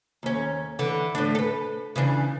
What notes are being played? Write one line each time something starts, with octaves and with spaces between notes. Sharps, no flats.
D#2 C#4
D3 E3
A2 D4
A4 B4
C#3 E3 D4